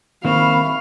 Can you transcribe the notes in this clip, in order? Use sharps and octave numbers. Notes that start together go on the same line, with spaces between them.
D#3 A#3 C4 E5 F5 B5 C#6